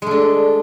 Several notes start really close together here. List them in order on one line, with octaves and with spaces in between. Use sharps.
G#3 A3 D4